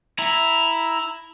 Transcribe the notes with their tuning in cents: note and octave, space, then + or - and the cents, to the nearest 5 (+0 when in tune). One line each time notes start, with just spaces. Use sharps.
E4 +0 A#5 +5